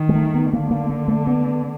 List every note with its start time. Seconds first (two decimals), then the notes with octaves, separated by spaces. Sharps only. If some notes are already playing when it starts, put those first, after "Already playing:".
Already playing: D#3
0.09 G#3
0.15 A3
0.34 B3
0.53 D3 A#3
0.71 A#3
0.90 A#3
1.08 A3
1.27 B3